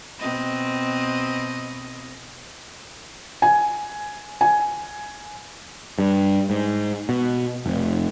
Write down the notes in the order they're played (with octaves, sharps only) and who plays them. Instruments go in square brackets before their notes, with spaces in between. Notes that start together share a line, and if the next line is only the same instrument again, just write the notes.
[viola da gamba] B2 C4 D#5
[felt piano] G#5
G#5
[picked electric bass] G2
G#2
B2
F1